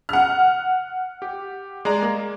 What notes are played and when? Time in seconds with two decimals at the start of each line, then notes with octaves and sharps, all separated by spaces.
0.09 F#5 F6
1.22 G4
1.85 G#3 D5 A#5
2.02 A#3